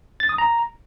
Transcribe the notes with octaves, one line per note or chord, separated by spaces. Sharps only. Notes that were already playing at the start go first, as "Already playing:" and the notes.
A6
D#6
A#5